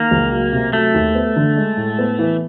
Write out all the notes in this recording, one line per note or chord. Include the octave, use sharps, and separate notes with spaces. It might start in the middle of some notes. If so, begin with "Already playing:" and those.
Already playing: D#3 A#3
C#2
F#3
C3
F#3 A3
D#2
B3
D3
G#3
A2
B3
E3